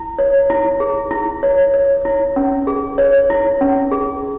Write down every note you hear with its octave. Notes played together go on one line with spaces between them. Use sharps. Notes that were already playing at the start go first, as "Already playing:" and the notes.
Already playing: E4
C#5
E4
G#4
E4
C#5
C#5
E4
C#4
G#4
C#5
E4
C#4
G#4